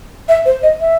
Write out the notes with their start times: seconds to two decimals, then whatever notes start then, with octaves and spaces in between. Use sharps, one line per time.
0.28 E5
0.45 C5
0.63 D#5
0.80 E5